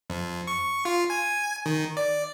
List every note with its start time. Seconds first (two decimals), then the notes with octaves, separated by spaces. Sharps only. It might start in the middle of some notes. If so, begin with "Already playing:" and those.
0.10 F2
0.47 C#6
0.85 F4
1.10 G#5
1.66 D#3
1.97 D5